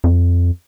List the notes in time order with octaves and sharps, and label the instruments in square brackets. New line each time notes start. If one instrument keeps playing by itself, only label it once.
[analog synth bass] F2